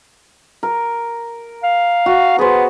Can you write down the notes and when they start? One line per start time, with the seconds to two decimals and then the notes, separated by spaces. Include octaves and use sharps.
0.63 A#4
1.63 F5
2.06 F#4
2.39 B3 G#4 C5